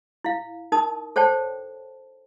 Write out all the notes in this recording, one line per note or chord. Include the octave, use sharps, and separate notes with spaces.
E4 F5
D#4 A#4 A5 D#6
A4 C5 C#5 G5 A5